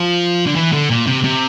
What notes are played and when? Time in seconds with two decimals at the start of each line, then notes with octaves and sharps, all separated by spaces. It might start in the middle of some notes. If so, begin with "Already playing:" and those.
Already playing: F3
0.46 D3
0.56 E3
0.72 D3
0.90 A#2
1.07 C3
1.24 C3